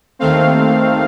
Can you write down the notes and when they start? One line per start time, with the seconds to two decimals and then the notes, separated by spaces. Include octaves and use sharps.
0.19 D#2 D#3 A3 C4 F5